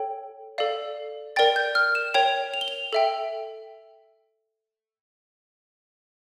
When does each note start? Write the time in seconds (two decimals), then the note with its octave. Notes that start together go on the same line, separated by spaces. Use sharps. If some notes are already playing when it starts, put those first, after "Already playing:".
Already playing: A4 C#5 G5
0.58 A4 D5 F5
1.36 A#4 D5 G5 A6
1.56 G6
1.75 F6
1.95 E7
2.14 A#4 C#5 G5 F7
2.54 F7
2.61 G7
2.68 F7
2.93 A4 E5 G5